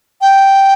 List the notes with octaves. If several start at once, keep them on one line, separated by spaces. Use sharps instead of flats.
G5